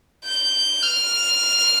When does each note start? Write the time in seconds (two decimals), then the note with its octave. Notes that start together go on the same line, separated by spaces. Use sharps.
0.25 G6
0.83 F6